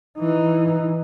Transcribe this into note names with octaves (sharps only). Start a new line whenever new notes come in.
E3 D#4